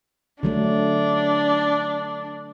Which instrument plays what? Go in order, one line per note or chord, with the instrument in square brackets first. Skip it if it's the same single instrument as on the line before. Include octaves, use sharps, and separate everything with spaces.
[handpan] D3 F#3 A3 [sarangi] D4